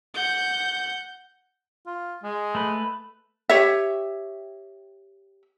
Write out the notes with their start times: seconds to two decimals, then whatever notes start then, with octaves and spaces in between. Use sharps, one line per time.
0.15 F#5 G6
1.86 F4
2.23 G#3
2.55 A3 B4
3.49 G4 C#5 E5